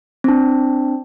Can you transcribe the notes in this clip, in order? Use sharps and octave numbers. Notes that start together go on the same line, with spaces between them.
C4 D4